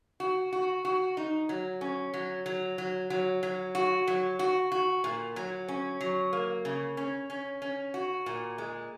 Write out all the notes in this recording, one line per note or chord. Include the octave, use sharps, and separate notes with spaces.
F#4
F#4
F#4
D#4
F#3
C#4
F#3
F#3
F#3
F#3
F#3
F#4
F#3
F#4
F#4
A#2
F#3
C#4
F#3
A#3
C#3
C#4
C#4
C#4
F#4
A#2
G#3